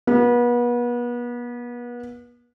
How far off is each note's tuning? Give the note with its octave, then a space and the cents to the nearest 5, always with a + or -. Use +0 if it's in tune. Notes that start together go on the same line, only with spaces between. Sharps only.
B3 -35